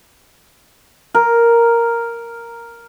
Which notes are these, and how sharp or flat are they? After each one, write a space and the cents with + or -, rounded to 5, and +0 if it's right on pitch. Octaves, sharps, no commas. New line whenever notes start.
A#4 +0